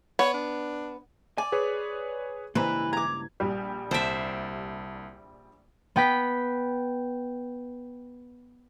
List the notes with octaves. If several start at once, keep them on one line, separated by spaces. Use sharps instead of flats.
B3 C#5
D4
D5 G#5
G#4 B4 C#5
C#2 G2 E3 A#3 B4
A#5 D6 G#6
A#1 G3
C2 C5 E5 A5 D7
B3 G5 B5 B6